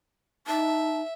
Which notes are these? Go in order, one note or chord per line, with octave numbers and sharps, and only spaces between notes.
D#4 E5 A5